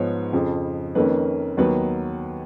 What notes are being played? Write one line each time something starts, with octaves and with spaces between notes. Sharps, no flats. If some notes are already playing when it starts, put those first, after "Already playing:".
Already playing: G#2 F3 B3 C#5
F2 C#3 F3
F2 D#3 A#3 C#4 B4
D#2 D#3 F#3 B3 B4